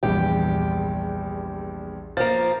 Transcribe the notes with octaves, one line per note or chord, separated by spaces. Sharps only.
A#1 E2 G2 G4
F3 A#3 A6